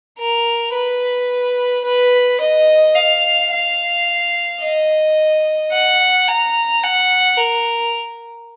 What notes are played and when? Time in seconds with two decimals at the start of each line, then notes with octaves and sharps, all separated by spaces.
0.19 A#4
0.74 B4
1.85 B4
2.41 D#5
2.95 F5
3.52 F5
4.62 D#5
5.72 F#5
6.28 A#5
6.83 F#5
7.38 A#4